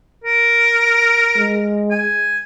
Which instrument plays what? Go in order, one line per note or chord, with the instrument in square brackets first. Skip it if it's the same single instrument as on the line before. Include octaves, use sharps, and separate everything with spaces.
[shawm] A#4
[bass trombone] G#3
[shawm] G#5